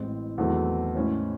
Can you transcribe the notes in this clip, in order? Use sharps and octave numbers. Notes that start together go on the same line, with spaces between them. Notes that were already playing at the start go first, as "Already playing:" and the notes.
Already playing: A1 A2 G#3 C4
E2 D#3 F#3 A3 C4
A2 G#3 C#4 E4 C5